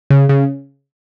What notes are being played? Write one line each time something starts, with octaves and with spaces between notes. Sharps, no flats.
C#3
C#3